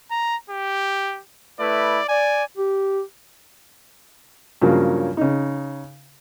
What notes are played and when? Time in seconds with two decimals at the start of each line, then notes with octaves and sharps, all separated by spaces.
0.11 A#5
0.50 G4
1.60 A3 E4 B4 D5
2.09 D5 G#5
2.57 G4
4.62 G2 C#3 F3 F#3 A#3 C#4
5.17 C#3 D#4